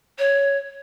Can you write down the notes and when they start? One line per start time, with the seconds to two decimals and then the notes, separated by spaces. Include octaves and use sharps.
0.19 C#5